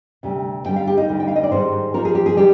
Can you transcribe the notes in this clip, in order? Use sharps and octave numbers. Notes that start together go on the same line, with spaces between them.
D2 C3 G3
D2 D3 G3 G5
F5
G4
D#4
D2 D3 G3
G5
F5
D#5
D5
G#2 D#3 G3 C5
G#2 F3 A#4
G#4
G4
G#4
D#3 G3 G4